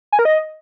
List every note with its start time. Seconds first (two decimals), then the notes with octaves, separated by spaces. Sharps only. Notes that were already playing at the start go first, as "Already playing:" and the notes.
0.12 G#5
0.19 A#4
0.25 D#5